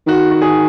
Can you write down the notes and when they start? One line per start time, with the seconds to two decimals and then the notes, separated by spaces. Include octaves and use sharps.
0.07 D#3 F#4
0.32 F#4
0.42 G#4